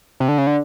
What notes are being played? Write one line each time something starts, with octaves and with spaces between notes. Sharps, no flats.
C3
D3
C#3
D3